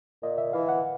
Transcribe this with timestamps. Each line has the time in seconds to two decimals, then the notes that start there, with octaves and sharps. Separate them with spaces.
0.23 A#2 D#5
0.38 E5
0.53 E3 F5
0.69 F#5